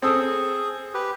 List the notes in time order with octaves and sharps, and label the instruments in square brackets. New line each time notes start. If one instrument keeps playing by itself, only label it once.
[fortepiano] C4 A4 D#6 [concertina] G#4
[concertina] G4 B4